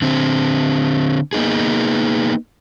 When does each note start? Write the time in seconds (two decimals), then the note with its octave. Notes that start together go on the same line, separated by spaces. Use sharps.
0.02 D3 C4
1.33 A#3 B3 D#4 G#4